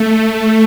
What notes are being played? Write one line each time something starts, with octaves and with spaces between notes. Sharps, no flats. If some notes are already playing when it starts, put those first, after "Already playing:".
Already playing: A3